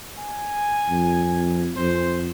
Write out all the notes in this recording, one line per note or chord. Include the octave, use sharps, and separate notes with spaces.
G#5
F2
F2 C5